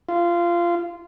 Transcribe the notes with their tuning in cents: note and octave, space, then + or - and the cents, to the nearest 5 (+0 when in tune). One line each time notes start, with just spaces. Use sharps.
F4 -20